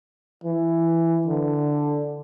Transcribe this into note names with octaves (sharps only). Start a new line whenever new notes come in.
E3
D3